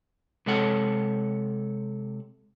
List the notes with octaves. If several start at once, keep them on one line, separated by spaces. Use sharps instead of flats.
C3 G#3 A4 C#5 F#5